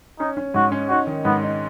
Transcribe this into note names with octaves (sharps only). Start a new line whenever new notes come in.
C#4 D#4
C#4
G#2 F#4
C#4
D#4 F#4
D#3
G#2 B3
D#4